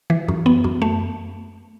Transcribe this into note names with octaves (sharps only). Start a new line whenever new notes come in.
E3
F#2
B3
F#2
A3